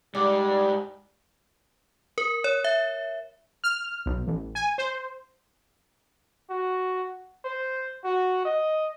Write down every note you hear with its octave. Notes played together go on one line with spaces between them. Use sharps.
G#2 G3 D5
A#4
C#5
E5
F6
B1
A1
G#5
C5
F#4
C5
F#4
D#5